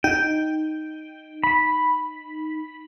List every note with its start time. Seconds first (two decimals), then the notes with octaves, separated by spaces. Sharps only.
0.04 D#4 G5
1.44 B5